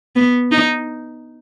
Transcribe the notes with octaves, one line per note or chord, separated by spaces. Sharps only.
B3
D#4